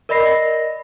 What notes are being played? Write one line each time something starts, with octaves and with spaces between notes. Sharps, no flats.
A#4 D5 D#5 B5 A#6 C7